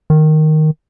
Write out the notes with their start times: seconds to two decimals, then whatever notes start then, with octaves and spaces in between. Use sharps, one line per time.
0.10 D#3